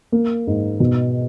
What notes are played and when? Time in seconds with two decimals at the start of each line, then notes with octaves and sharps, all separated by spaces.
0.12 A#3
0.47 G#2
0.80 B2